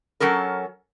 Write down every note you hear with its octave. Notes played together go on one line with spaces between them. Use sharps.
F#3 C#4 A4 A#4